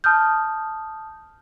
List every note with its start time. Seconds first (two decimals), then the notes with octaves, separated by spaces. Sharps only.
0.04 A5 D#6 F6 G6